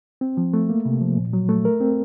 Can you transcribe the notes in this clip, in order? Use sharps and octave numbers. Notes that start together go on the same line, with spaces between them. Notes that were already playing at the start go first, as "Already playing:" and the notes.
C4
F3
A3
A#3
C3
F3
A#2
F#3
A3
A#4
C4